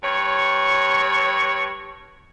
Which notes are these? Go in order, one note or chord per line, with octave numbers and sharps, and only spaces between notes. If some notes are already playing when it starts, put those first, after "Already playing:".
G2 C#5